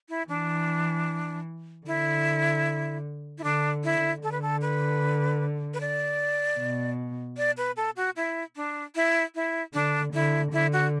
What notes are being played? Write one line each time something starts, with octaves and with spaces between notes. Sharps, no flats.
E4
E3 D4
D3 E4
E4
D3 D4
E4
D3 A4
B4
A4
B4
B4
D5
B2
D5
B4
A4
F#4
E4
D4
E4
E4
D3 D4
D3 E4
D3 E4
F#4